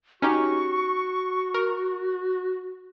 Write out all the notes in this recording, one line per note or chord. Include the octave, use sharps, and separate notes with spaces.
C#4 D#4 F#4 G4 C#6
A#4